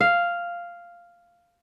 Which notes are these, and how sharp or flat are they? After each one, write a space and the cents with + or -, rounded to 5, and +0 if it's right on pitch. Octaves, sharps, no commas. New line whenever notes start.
F5 -5